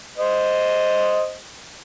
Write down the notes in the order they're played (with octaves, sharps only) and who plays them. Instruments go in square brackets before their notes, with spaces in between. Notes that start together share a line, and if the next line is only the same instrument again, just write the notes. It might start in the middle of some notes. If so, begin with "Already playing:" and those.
[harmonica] C5 D#5